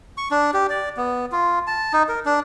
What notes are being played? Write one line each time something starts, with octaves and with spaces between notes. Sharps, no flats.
C#6
D4
G4
D5
B3
F4
A5
D#4
A#4
D4